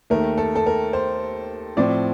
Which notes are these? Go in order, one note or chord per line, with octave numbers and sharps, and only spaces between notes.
D#2 D#3 A3 A#4
A4
A4
A#4
C5
A2 F3 C4 D5